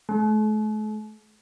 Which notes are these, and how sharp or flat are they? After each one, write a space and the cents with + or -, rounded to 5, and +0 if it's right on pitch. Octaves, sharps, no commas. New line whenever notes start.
A3 -45